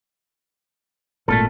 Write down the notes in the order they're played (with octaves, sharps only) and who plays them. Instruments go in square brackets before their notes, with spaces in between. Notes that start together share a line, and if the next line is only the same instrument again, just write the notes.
[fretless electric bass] G#1 A#2 [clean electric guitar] A3 F4 A4